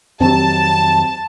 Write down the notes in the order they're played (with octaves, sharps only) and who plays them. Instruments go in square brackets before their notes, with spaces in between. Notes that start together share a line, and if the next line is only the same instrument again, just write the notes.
[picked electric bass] F2 D#3 F#3 [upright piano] C4 G4 [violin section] A5